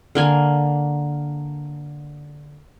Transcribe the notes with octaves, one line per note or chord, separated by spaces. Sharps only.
D3 A#3 G#5